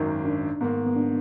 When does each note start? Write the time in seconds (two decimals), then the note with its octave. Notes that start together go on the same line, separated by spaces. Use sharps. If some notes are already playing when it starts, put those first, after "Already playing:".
Already playing: G#1 F#2 D#3 D#4
0.25 D4
0.61 G#2 D#3 A#3 B3
0.86 B3
0.96 D4